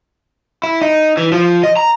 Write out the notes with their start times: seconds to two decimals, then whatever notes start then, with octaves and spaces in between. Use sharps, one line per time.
0.64 E4
0.82 D#4
1.17 E3
1.32 F3
1.63 D#5
1.77 A#5